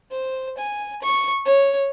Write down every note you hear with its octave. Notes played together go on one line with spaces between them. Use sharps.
C5
G#5
C#6
C#5